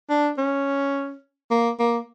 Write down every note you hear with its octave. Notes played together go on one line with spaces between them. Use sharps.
D4
C#4
A#3
A#3